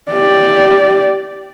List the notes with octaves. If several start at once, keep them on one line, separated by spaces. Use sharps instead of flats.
G4 D5